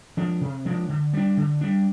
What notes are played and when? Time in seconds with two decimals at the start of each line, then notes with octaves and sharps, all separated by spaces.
0.17 F3 G#3 D4
0.41 C3
0.65 F3 G#3 D4
0.89 D3
1.13 G3 D4
1.37 D3
1.61 G3 D4